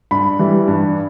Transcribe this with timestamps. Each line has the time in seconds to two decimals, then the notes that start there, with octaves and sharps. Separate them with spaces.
0.11 G2 B5
0.39 E3 G3
0.67 G2